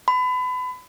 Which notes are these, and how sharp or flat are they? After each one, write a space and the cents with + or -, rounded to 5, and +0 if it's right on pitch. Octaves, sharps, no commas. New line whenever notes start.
B5 +30